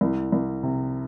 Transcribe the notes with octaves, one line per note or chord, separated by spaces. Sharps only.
C2
C2
C3